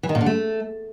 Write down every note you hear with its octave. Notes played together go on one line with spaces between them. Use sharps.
E3
D#3
A#2
D3
A3